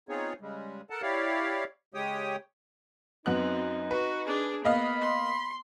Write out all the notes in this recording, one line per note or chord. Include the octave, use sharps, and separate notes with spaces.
B3 C4 D#4 F4 G#4 C#5
C#3 G3 G#3
A4 A#4 F#5 A5
E4 G4 C#5 D5 F5
C#3 G#3 G4 C#5 G5 D#6
F#2 B3 C4 D#4 F#6
F#4 B4
D4 G#4
A#3 B3 D#5 F5 B5
C6